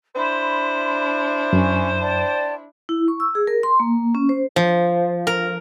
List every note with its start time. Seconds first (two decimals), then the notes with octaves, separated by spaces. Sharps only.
0.16 D4 E4 C5 B5 C6
1.53 F#2 C#4 G#5
1.98 D5 G5 A5
2.89 E4
3.08 C#6
3.20 E6
3.35 G#4
3.47 A#4
3.63 C6
3.80 A#3
4.15 C#4
4.29 C5
4.56 F3
5.27 A#4